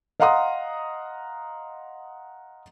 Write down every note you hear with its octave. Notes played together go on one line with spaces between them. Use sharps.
D#5 F5 F#5 A#5 C6 D#6